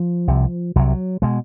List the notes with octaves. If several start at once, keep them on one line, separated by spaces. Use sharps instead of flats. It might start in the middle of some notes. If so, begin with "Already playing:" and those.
Already playing: F3
C2 C3
C2 C3 F#3
B2 G#3